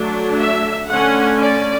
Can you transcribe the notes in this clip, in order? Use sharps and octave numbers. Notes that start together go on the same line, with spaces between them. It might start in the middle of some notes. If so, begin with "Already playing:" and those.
Already playing: F#3 A3 D4
E5
D3 A3 C#4 F#5
D5